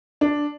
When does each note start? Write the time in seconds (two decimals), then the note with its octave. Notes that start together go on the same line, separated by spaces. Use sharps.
0.21 D4